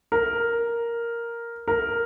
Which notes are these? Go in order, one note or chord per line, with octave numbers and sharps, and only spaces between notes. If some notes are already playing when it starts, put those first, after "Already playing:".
A#4
A#4